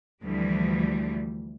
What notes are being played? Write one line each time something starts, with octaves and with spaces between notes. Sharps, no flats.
D2 E3 F3 G3